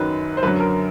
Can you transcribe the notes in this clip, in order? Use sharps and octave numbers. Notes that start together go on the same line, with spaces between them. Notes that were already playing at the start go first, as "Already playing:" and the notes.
Already playing: F#2 D#3 F#3 B4
C5
F#2 D3 F#3 B4
A#4